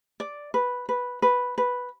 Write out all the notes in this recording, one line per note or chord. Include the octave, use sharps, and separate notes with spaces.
D5
B4
B4
B4
B4